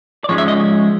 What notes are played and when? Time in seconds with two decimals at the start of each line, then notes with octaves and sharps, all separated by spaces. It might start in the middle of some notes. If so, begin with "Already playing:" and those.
0.24 D5
0.29 G#2 F3 G#3 C#4 C#5
0.38 E5
0.48 D#5